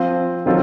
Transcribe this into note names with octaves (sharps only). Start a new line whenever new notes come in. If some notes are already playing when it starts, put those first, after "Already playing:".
Already playing: F3 C4 F4
D#3 F#3 C4 F4 A4